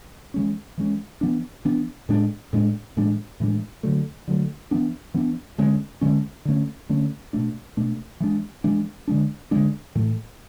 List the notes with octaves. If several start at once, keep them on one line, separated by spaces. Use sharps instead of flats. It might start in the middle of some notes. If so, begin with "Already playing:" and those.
E3 G#3 C#4
E3 G#3 C#4
E3 B3 D4
E3 B3 D4
A2 G#3 D4
A2 G#3 D4
A2 E3 G#3 D4
A2 E3 G#3 D4
D3 F#3 A3
D3 F#3 A3
E3 B3 D4
E3 B3 D4
D3 G#3 C#4
D3 G#3 C#4
D3 A3 C#4
D3 A3 C#4
B2 A3 D4
B2 A3 D4
E3 G#3 D4
E3 G#3 D4
D3 G#3 D4
D3 G#3 D4
A2 E3 A3